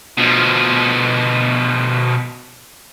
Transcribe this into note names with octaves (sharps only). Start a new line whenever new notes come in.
B2 F3